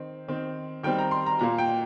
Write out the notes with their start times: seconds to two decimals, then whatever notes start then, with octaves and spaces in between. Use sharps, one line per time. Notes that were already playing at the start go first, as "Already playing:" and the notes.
Already playing: D#3 C4
0.28 D#3 C4
0.83 D#3 G3 C4 G5
0.98 A#5
1.11 C6
1.26 A#5
1.39 A#2 A#3 A#5
1.58 G5